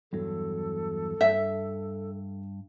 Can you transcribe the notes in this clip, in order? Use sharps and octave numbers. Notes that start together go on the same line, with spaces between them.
E2 G2 F#3 A4
G2 E5